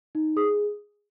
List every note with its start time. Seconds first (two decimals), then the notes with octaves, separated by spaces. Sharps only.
0.15 D#4
0.36 G#4 D#6